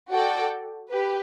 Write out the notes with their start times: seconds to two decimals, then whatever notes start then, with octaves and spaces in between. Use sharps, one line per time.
0.11 F#4 A4 D5 G5
0.90 G4 B4